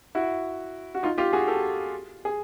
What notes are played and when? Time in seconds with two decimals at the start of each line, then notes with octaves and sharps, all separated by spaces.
0.15 E4 F#4
0.95 F#4
1.03 D#4 F4
1.18 F4 G4
1.33 F#4 G#4
1.48 G4 A4
2.25 G#4